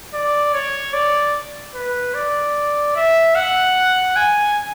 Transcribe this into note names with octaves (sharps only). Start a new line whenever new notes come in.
D5
C#5
D5
B4
D5
E5
F#5
G#5